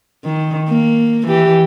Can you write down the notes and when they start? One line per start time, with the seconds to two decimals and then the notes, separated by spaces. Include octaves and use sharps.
0.24 D#3
0.69 A#3
1.28 E3 G4